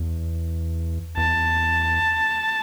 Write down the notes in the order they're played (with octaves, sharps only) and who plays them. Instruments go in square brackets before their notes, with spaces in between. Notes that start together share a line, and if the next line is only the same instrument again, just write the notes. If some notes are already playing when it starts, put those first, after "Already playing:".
Already playing: [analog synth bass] E2
[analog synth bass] E2 [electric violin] A5